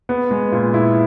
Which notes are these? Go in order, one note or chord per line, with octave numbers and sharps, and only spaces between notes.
B3
G#3
A#2
E4